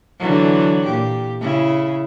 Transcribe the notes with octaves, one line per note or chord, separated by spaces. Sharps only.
D3 E3 F#3
A#2 G4
C#3 E4